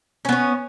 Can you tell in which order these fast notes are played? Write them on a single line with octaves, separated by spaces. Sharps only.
C#4 B3 C#5